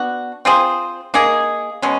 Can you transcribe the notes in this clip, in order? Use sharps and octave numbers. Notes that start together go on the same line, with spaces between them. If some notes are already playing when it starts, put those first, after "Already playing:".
Already playing: B3 D4 F#4
C4 F4 G#4 C5
A#3 D#4 G#4
B2 G#3 C#4